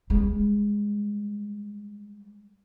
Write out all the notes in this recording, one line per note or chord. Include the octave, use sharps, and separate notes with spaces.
G3 G#3